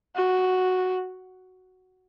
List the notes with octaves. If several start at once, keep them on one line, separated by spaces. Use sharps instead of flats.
F#4